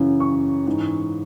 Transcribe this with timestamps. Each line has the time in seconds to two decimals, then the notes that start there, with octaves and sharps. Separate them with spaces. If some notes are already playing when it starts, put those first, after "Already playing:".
Already playing: F#2 C#3 E3
0.20 C#6
0.67 G#2 E3